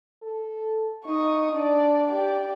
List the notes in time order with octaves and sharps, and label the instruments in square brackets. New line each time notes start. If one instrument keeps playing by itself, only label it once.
[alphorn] A4
[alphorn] D#4 [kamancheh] C#6 D#6
[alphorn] D4 [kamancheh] D5
[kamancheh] G4 D5